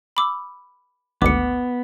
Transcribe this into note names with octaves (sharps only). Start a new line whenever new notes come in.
B5 D6 E6
G#1 D2 B3 D6 C#7